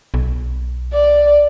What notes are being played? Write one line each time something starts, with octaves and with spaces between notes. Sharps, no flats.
B1
D5